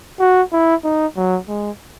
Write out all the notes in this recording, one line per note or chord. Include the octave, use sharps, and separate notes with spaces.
F#4
E4
D#4
F#3
G#3